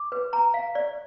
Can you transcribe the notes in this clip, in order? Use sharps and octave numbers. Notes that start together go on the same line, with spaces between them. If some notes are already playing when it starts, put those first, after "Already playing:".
Already playing: D6
B4
A#5
F5
D5